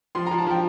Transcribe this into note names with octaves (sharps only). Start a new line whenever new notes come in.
F3 C6
F3 A#5
A5
F3 G5